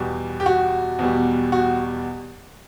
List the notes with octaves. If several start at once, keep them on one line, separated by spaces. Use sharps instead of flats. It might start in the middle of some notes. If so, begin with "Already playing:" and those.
Already playing: E2 B2 G3
G4
F#4
E2 B2 G3
F#4